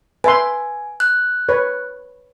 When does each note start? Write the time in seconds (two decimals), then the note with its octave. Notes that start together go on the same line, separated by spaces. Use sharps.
0.24 B4 E5 G#5 C6
1.00 F#6
1.49 B4 C#5